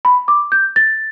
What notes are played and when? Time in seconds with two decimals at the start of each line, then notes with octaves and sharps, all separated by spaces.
0.05 B5
0.28 D6
0.52 G6
0.76 A6